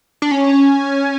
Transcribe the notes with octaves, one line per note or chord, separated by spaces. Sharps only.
D4
C#4